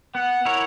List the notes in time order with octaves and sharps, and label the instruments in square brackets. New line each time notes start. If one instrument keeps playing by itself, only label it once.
[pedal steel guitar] B3 [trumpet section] F#5
[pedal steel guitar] E4 A#4 C#5